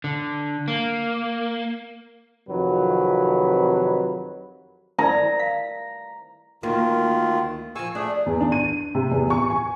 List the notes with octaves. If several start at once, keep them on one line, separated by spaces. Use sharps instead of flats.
D3
A#3
F2 C3 D#3 F#3 B4
A#4 D5 A#5
F5
D2 D#3 A#3 F4
F3 F5 G#5 C#6 E6
A3 D4 G#4
E2
D4
D#7
C3
E2
C#6
G#5